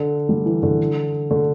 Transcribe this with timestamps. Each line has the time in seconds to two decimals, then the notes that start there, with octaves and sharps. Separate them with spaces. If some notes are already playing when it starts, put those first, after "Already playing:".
Already playing: D3
0.29 G3
0.46 E3
0.63 D3
1.31 D3